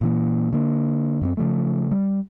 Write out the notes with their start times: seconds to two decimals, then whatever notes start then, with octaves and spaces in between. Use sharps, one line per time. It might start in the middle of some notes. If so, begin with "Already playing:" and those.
0.01 A#2 E3 A#3
0.53 D3 A#3
1.21 F#2 A#3 C4
1.37 C#3 F3 A3
1.91 G3